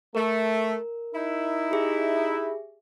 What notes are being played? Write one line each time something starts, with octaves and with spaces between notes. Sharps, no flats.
A3 A#4
D#4 E4
G4 G#4 E5